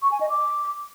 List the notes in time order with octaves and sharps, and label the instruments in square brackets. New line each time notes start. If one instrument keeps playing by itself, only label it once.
[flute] C#6
G#5
D#5
D6